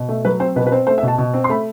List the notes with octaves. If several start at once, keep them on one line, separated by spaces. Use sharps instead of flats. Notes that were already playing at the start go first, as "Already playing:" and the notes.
Already playing: B2
A3
F#3 B4
C4 C5
B2 B4
B4
C4 C5
A3 C5
E5
B2
A5
B2
C4
C6
A3 B5